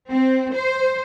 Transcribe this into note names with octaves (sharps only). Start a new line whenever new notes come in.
C4
C5